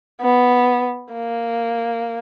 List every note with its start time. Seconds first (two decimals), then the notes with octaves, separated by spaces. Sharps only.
0.22 B3
1.13 A#3